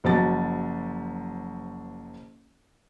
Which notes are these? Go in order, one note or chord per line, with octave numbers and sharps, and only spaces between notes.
F#1 F3 F#3 A6